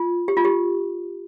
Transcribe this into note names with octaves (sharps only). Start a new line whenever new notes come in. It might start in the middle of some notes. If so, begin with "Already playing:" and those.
Already playing: F4
G4
F4
G4